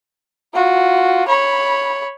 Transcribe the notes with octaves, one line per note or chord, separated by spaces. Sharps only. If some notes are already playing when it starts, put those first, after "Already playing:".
F4 F#4
C#5 B5